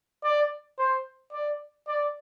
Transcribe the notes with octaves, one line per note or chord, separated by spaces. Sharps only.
D5
C5
D5
D5